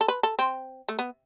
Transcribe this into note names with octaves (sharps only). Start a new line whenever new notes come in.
A4
B4
A4
C4
A3
B3